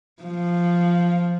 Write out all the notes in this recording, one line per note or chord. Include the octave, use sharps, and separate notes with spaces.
F3